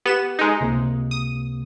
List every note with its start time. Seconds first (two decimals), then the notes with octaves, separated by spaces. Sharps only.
0.06 B3 G4 E7
0.39 G#3 D#4
0.61 C#2 C3 A#3
1.11 D#6